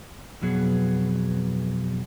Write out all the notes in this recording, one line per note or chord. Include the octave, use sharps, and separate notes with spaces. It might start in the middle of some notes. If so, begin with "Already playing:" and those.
F2 B2 F#3 B3 G#4